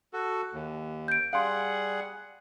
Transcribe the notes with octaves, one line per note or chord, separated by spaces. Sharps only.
F#4 A4
D#2
G6 D7
G3 G#4 F5 F#5 C6